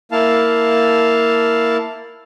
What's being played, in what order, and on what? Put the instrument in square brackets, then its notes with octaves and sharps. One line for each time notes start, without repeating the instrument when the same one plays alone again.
[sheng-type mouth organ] A#3 E4 F5 A5